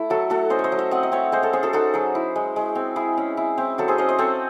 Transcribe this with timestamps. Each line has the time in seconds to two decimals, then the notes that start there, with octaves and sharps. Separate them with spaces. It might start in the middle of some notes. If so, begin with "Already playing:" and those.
Already playing: A3 E4
0.10 F#3 F#4 A4
0.30 A3 F#4 A4
0.50 C#4 C5 D#5
0.59 C#5
0.64 C5 D#5
0.72 F#3
0.78 C#5 E5
0.91 C4 D#5 F#5
1.03 D#5
1.12 C4 C#5 E5
1.32 G#3 C5 D#5
1.42 A4 C#5
1.53 C#4 G#4 C5
1.63 F#4 A4
1.73 D#4 F#4 A4
1.94 F#3 G#4
2.15 E4
2.36 G#3
2.56 G#3
2.75 C4
2.96 E4 G#4
3.18 C#4
3.37 E4
3.58 C4
3.78 F#3 F#4 A4
3.88 G#4 C5
3.98 C#4 C5 D#5
4.09 C5 D#5
4.19 C4 A4 C#5